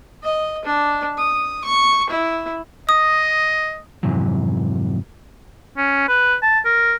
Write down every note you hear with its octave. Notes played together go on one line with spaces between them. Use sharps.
D#5
D4
D#6
C#6
E4
D#5 D#6
F2 G#2 C3 E3 F#3
C#4
B4
A5
A#4